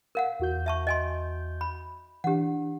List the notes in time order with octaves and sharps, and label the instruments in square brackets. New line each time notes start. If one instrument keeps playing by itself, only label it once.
[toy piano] A#4 F5 F#5
[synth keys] E2 F#4 G6
[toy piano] E5 A5 C#6
D#5 G#5 C6
B5
[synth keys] E3 D4 [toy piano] G4 F#5